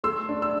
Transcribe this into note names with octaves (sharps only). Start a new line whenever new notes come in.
A3 C6 E6
D4
E6